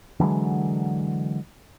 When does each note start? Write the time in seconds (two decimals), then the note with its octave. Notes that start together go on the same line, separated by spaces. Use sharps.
0.20 D3 E3 F#3 G#3